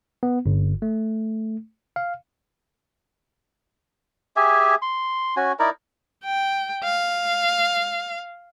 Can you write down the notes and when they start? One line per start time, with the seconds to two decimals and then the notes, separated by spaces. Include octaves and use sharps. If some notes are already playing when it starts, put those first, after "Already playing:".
0.23 B3
0.46 G1
0.82 A3
1.96 F5
4.36 G4 G#4 E5 G#5
4.82 C6
5.36 C#4 F#4 G#5
5.59 D#4 E4 A#4 D5
6.24 G5
6.84 F5